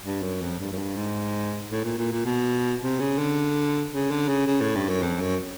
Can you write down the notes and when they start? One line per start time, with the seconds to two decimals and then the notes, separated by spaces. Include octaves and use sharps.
0.04 G2
0.22 F#2
0.42 F2
0.60 G2
0.73 F#2
0.78 G2
0.97 G#2
1.71 A2
1.84 A#2
1.98 A#2
2.12 A#2
2.26 B2
2.81 C3
3.00 C#3
3.18 D3
3.92 C#3
4.11 D3
4.28 C#3
4.47 C#3
4.61 A2
4.76 G2
4.89 F#2
5.03 F2
5.21 F#2